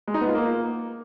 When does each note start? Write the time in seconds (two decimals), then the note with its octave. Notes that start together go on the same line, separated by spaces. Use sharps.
0.08 G#3
0.14 D#4
0.21 B3
0.28 F4
0.35 A#3